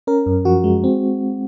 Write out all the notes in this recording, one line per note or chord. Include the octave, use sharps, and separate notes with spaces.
C#4 A#4
F#2
F3 F#4
G#3
C4